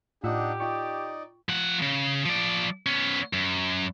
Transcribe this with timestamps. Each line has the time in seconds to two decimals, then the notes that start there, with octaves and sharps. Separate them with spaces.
0.24 A2 D4 D#4 F4 G4 F#5 E6
0.60 D#4 F4 D5 G5 C#6
1.49 F3 F#5
1.82 C#3
2.25 F3 D5
2.86 B3 C#4
3.33 F#2